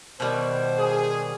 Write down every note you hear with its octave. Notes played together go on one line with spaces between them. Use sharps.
B2 D#3 G3 C5
G#4